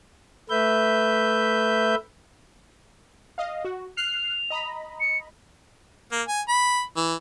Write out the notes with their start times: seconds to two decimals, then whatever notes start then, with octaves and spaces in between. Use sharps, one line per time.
0.50 A3 B4 E5 G6
3.38 D#5 F5
3.65 F#4
3.97 F6 F#6 C7 F7
4.50 D#5 A#5 B5
5.00 C#7
6.12 A#3
6.28 G#5
6.48 B5
6.96 E3